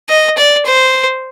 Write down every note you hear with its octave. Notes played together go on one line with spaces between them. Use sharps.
D#5
D5
C5